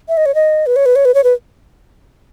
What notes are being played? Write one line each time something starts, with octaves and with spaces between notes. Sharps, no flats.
E5
D#5
C#5
D#5
B4
C#5
B4
C#5
B4
C#5
B4